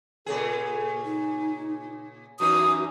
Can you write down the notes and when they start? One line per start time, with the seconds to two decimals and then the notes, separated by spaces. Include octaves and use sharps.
0.26 A#2 C#3 G#4 A4
1.05 D#4
2.40 F#2 E3 D#4 F#4 D#6